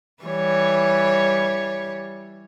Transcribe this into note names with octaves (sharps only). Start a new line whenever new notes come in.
E3 G3 C#5